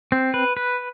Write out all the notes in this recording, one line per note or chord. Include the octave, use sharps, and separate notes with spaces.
C4
B4
B4